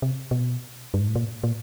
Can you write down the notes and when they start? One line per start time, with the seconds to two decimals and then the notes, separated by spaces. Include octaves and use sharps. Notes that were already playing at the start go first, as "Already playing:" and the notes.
0.02 C3
0.31 B2
0.94 G2
1.01 G#2
1.08 A2
1.15 A#2
1.44 A#2